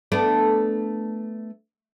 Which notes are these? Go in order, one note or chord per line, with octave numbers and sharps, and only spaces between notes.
A3 B3 D4